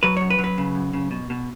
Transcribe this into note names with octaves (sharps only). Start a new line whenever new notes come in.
F#3 B4
F#2 C#5
B4
F#3
B4
C#3
F#2
C#3
B2
B2